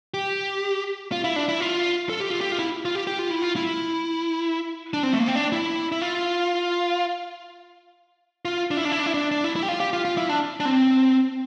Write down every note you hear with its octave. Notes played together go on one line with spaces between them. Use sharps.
G4
F4
E4
D4
E4
F4
A4
G4
F4
G4
F4
E4
F4
G4
G4
F4
E4
F4
E4
D4
C4
A3
A#3
C4
D4
E4
E4
F4
F4
D4
E4
D4
E4
D4
E4
D4
D4
E4
E4
G4
F4
G4
F4
F4
E4
D4
D4
C4